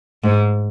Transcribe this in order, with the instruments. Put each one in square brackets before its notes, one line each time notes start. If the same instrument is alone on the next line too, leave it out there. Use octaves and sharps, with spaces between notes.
[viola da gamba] G#2